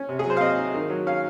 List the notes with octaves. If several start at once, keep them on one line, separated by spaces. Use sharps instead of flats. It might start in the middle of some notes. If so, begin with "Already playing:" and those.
Already playing: C#4
C3
G#4
F#3
C5
F5
C4 D#5
D#4
D#3
F#3
C#4 F5